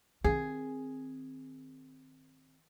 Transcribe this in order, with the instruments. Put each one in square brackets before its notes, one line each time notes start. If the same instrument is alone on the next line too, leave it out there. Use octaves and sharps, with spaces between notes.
[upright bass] D#3 C4 [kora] G#4